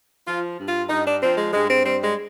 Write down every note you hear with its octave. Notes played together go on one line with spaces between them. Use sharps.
F3 F4
G2
F4
G2 D#4
D4
F3 C4
G#3
G2 G#3
C4
G3 C4
G#3